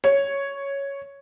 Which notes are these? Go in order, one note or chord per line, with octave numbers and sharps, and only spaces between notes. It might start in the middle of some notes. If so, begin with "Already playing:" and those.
C#5